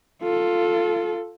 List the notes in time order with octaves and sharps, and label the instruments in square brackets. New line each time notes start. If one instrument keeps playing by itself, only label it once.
[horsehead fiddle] F4 A4